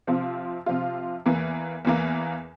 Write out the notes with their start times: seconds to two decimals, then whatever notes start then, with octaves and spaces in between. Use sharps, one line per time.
0.07 C3 F3 C4 F4
0.66 C3 F3 C4 F4
1.26 E2 E3 A#3
1.85 E2 E3 A#3